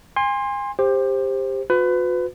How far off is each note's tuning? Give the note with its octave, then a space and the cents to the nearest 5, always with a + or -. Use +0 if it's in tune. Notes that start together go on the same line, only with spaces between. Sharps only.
G#5 -35 C6 +15
G4 +20 C5 +10
F#4 -45 B4 +25